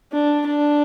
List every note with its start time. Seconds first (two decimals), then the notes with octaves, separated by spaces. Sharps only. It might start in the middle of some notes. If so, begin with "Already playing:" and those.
0.12 D4
0.47 D4